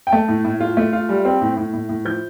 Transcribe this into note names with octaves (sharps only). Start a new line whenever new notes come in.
G5
A3 A5
A2
A2
F4
A3
F4
G3
C4
A2
A2
A2
A2
F3 G6